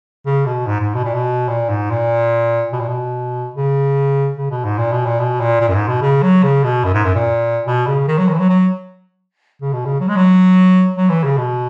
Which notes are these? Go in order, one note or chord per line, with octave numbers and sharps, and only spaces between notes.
C#3
B2
G#2
G#2
B2
A#2
B2
A#2
G#2
A#2
B2
A#2
B2
C#3
C#3
B2
G#2
A#2
B2
A#2
B2
A#2
A#2
F#2
G#2
B2
C#3
F#3
C#3
B2
F#2
G#2
F#2
A#2
B2
C#3
D#3
F#3
D#3
E3
F#3
F#3
C#3
B2
C#3
F#3
G#3
F#3
F#3
E3
C#3
B2